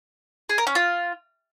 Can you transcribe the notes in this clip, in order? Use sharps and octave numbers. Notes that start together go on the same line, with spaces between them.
G#4
A#4
C#4
F4